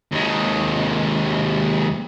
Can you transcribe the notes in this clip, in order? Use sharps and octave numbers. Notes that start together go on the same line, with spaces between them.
D#2 G#3